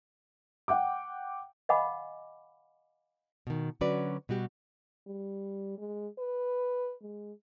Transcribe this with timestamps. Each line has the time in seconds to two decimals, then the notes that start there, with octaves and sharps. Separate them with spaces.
0.68 F#5 G5 D6
1.69 D#5 F5 F#5 G#5 B5 D6
3.47 B2 D#3
3.81 D3 F#3 C#4 F#4 B4 D5
4.29 B2 G3 F#4 G4
5.07 G3
5.78 G#3
6.19 B4
7.02 G#3